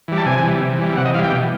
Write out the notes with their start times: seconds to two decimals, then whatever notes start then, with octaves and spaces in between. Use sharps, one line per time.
0.08 E3 G3
0.18 A5
0.26 C3 G#5
0.43 E3 G3
0.61 C3
0.79 E3 G3
0.97 C3 F#5
1.05 D#5
1.14 E3 F5
1.19 G3 G5
1.32 B2